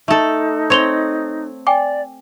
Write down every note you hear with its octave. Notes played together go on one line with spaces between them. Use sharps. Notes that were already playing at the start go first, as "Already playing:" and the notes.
A3 D#4 A4
C4 C#5 C6 F7 G7
D5 G5 G#5 D6